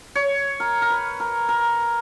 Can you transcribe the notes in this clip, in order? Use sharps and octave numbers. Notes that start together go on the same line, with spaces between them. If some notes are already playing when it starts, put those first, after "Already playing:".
C#5
A#4
A#4
B4
A#4
A#4